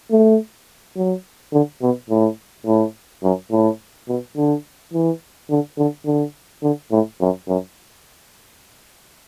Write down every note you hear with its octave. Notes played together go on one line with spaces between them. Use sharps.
A3
F#3
D3
B2
A2
A2
F#2
A2
B2
D3
E3
D3
D3
D3
D3
A2
F#2
F#2